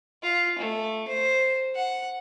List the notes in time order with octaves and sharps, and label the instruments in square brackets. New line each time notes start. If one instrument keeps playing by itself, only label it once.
[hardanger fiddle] F4
A3
C5
F#5